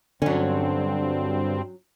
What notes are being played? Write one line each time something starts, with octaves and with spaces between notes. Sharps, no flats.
G2 D3 F#3 C4 C#4